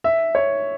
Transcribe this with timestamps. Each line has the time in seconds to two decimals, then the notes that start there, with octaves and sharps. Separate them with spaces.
0.04 E5
0.35 C#5